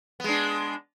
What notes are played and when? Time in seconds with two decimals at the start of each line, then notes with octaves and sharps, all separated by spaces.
0.20 B3
0.24 G#3
0.29 D4